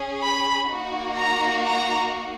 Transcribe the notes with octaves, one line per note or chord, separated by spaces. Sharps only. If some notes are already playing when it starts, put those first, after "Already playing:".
Already playing: C#4 G#4
B5
A#3 D#4 F#4
A#5
A#5